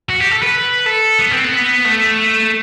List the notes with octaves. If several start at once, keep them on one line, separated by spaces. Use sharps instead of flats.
F#4
G4
A4
B4
A4
B3
C4
B3
A3